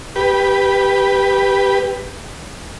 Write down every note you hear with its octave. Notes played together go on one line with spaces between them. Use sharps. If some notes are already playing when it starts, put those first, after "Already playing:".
G4 B4